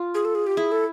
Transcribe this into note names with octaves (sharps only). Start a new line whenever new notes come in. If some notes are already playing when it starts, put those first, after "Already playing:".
Already playing: F4
G#4
A4
G#4
G4
E4 G#4
A4